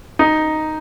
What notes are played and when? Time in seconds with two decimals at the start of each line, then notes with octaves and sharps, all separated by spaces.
0.19 D#4